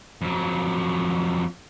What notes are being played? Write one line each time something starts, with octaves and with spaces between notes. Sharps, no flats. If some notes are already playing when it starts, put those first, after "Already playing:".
F2 F#3